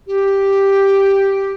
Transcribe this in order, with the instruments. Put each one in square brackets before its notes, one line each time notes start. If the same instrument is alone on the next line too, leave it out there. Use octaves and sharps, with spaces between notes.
[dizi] G4